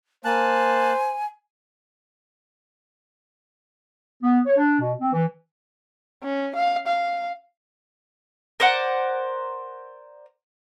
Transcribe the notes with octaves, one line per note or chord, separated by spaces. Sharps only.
A#3 C5 G#5 A5 F#6
B3
C#5
D4
B2
C4
E3
C#4
F5
F5
A#4 C5 D5 F#5